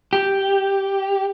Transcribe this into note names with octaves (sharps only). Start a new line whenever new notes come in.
G4